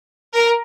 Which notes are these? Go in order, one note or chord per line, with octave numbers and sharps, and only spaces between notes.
A#4